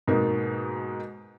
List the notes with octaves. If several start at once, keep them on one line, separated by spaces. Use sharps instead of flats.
G#2 B2 G#3 A#3 D#4